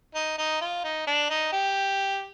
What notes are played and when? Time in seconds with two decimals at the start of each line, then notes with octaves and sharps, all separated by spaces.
0.15 D#4
0.38 D#4
0.61 F4
0.84 D#4
1.07 D4
1.30 D#4
1.52 G4